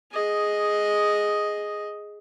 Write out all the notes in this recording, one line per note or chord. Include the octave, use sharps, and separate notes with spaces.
G#4 D#5